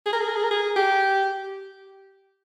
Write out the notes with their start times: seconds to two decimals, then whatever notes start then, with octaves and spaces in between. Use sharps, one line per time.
0.06 G#4
0.13 A#4
0.21 G#4
0.28 A#4
0.36 G#4
0.43 A#4
0.51 G#4
0.76 G4